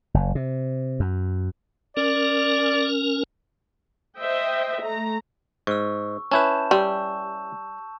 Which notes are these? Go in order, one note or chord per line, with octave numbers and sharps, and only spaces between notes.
F#1
C3
F#2
C#4 A#4 D5
C5 D#5 E5 G5
A3 A#5
G#2 C#6 E6
C#4 E4 B4 A5 G6 E7
G3 C#6 E6